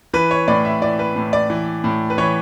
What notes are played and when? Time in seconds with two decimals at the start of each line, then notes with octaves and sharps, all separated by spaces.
0.13 E3 B4
0.31 C#5
0.48 A2 D5
0.65 E5
0.82 E3 D5
0.99 B4
1.16 A2
1.33 D5
1.50 E3
1.84 A2
2.10 B4
2.18 E3 C#5